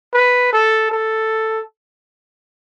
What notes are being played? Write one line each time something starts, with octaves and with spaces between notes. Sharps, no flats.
B4
A4
A4